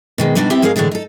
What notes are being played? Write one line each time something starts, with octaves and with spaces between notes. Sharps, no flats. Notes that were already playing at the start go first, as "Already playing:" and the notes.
B2 D#3 G#3
B2 G3 D4 D#4 F#4
B3 C4 E4 G4 E5
G#2 G#3 G#4 A#4 F5
A2 D3 E3 G#3 D4
D#4 A4